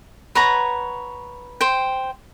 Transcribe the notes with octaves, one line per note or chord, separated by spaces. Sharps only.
B4 C#5 F#5 A#5
C5 G5